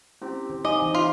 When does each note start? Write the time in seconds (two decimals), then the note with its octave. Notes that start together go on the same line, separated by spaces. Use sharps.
0.22 C4 C#4 E4 F4 G4 G5
0.50 D#3 C5
0.65 D#4 D#5 F5 G#5 D6
0.82 E3 D#4
0.95 F4 G4